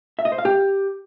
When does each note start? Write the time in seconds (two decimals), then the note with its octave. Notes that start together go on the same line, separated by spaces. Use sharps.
0.19 E5
0.25 D#5
0.32 C5
0.38 F5
0.45 G4